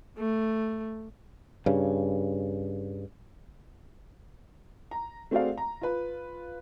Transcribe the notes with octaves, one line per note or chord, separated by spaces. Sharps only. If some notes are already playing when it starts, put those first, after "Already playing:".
A3
G2 C#3
A#5
A3 C4 F#4 G#4 D5 F5
A#5
F4 B4